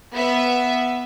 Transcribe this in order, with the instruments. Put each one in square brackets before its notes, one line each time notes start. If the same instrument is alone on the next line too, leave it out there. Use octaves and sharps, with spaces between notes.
[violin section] B3 E5